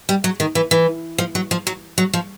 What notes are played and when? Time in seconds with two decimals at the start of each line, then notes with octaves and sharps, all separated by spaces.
0.09 G3
0.24 F#3
0.40 D#3
0.55 E3
0.71 E3
1.18 F3
1.35 F#3
1.51 F3
1.67 F#3
1.98 F#3
2.13 F3